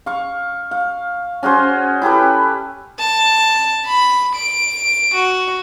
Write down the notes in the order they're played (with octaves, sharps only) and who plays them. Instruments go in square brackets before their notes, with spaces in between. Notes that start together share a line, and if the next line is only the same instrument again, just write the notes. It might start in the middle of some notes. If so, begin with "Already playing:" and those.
[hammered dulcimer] F5 C#6
F5
C#4 F#4 G#4 C5
E4 G4 A4 B4
[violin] A5
B5
D7
F#4